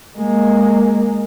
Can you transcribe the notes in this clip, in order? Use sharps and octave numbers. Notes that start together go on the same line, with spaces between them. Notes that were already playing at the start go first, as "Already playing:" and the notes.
G#3 A#3